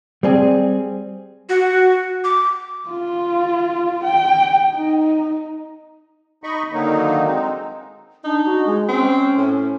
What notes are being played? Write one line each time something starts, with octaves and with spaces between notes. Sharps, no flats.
G3 C4 G#4
F#4
D6
F4
G5
D#4
D#4 D#5 B5 C#6
D3 D#3 F#3 A#3 D#4
G#3 C4 D#4
D4 D#4
F#4
G#3
C4 C#4
A2